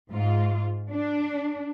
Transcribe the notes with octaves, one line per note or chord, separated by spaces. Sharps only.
G#2 F4
D4